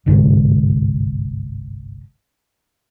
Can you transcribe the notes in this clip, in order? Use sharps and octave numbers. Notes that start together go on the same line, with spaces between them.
G1 C2 G#2 D3